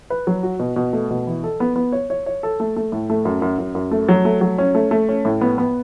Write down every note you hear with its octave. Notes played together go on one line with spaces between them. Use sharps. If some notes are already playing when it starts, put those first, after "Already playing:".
B4
F#3
F#4
B2
B2
A3
B2
E3
A4
B3
B3
C#5
C#5
C#5
A4
A3
A3
A2
A3
F#2
F#2
F#2
F#2
A3
F#3
A3
F#3
C#4
A3
A3
C#4
A2
B3
B3